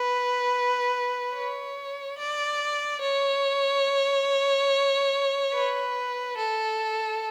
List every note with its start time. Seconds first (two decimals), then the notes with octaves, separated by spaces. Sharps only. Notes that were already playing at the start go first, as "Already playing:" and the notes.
Already playing: B4
1.34 C#5
2.18 D5
3.01 C#5
5.53 B4
6.37 A4